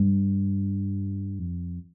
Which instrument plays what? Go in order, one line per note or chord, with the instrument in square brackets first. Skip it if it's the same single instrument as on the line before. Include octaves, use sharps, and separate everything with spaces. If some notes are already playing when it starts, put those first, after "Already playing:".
Already playing: [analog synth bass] G2
F2